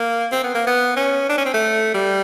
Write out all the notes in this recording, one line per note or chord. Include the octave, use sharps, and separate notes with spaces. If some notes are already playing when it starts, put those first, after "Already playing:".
Already playing: A#3
C4
B3
A#3
B3
C#4
D4
C#4
C4
A3
G3